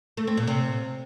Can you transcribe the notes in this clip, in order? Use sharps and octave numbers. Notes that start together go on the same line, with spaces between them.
A3
C4
A#2
C3